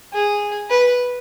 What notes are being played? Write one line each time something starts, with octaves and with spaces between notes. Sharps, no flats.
G#4
B4